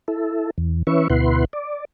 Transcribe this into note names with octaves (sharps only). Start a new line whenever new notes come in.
E4 A4
E2
E3 C#4 B4 E5 C#6
D2 B2 E4 B4 F#5 C6
D5